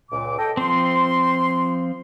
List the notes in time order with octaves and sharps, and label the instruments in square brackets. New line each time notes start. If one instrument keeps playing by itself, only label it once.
[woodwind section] C#2 A#2 D6
A4 D#5 G5
[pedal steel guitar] F3 C4 [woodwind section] C6